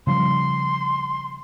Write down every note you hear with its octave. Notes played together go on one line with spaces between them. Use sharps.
C#3 F3 G3 C6